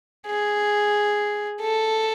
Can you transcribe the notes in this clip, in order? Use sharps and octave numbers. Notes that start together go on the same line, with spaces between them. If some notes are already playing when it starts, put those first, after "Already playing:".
G#4
A4